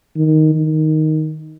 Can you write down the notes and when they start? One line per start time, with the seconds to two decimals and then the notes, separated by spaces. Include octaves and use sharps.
0.16 D#3
0.55 D#3